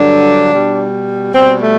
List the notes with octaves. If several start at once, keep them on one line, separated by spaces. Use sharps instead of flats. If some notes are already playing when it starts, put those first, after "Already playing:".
Already playing: G2 D3 F#3 D4
B2 G3
B2 G3 C4
A3